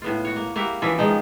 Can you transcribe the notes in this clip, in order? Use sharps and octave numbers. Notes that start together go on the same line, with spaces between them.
A2 B3 F4
F#4 C#5
A#3
A#3 E4 F#4 G4
E3 F3 C#4 E4
D#3 F3 G#3 D#4